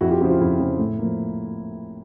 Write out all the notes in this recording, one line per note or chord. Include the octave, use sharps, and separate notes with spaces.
F2 E4 F#4
F4 G4
C#3 F3 E4 F#4
F4
F2 E4
C#3 F3
A2
F3 A#3